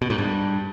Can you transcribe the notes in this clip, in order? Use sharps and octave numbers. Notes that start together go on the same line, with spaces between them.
B2
G#2
G2